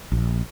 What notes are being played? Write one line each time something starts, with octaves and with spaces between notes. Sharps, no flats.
A#1